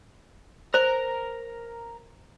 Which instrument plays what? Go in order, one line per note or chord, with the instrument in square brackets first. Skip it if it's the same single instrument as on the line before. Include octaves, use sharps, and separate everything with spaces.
[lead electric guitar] A#4 A#5 [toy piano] C5